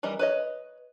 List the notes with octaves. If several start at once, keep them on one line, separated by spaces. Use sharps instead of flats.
E3 G3 A#4 D#5
B4 C#5 D#5